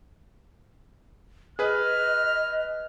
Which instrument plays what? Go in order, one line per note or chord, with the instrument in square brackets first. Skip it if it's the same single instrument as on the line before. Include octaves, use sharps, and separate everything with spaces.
[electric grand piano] G#4 B4 [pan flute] D#5 [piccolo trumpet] F6